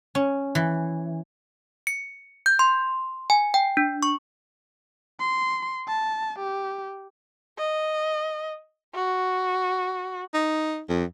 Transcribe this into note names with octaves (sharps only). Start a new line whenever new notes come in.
C#4
E3
C#7
G6
C6
G#5
G5
D4
C#6
C6
A5
G4
D#5
F#4
D#4
F2